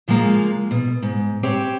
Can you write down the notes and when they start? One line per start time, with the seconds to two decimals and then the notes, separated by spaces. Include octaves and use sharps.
0.08 C#3 F3 G#3 A#3 F5
0.71 B2
1.02 G#2
1.43 C4 G4 C#5 E5